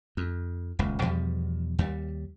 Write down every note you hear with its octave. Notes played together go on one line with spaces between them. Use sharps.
F2
D#1 C#2 A#2
E2 B2 F3 G3
D#2 G3